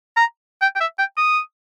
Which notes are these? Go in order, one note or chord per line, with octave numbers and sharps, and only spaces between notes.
A#5
G5
G5
E5
G5
D#6